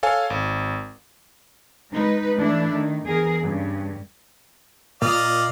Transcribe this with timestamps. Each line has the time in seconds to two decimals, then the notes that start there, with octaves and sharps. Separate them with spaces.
0.03 A4 C#5 F5 G#5
0.30 G#1
1.91 G#3 D#4 B4
2.37 E3 A3 D4 E4
2.74 D#3
3.06 E2 G#4 A#4
3.42 G2 C#3
5.02 A#2 D5 D#5 F5